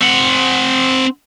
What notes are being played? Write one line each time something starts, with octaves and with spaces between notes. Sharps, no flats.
C4 F#5